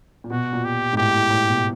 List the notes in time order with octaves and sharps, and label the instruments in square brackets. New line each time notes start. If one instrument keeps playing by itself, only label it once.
[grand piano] A#2
[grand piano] B2 [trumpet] F#4
[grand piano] A#2
[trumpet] G4
[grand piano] G#2
[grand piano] A2 [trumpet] G4
[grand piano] A2
A2
B2